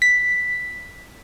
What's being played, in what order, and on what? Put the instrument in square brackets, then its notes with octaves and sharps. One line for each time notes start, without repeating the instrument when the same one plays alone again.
[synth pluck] B6